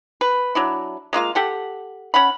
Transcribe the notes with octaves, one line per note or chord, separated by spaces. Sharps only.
B4
F#3 D4 E4
G#3 A#3 F4 F5
G4 A4 F#5
C#4 F#5 B5